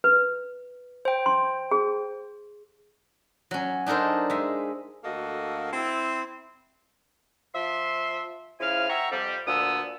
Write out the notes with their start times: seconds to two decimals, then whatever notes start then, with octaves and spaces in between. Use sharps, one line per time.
0.04 B4
1.05 C5 G5
1.26 C6
1.71 G#4
3.51 F#3 C#4
3.86 D4 D#4 A4 A#4 C5
4.30 G#3 E5
5.04 D2 A#3 F#4 A4 D#5
5.73 C4 E4
7.54 F3 E5 C6
8.60 C#3 F3 E4 F5 G#5 F6
8.89 E5 F#5 G5 A#5 C#6 E6
9.11 F2 G3
9.47 D2 A#2 D3 B3 D#6 E6